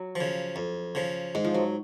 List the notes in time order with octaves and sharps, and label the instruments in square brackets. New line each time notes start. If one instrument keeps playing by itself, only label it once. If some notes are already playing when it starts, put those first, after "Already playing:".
Already playing: [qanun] F#3
[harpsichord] F3
C#3
F2
C#3 F3
[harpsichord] G#2 [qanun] G#3
[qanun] F3
F#3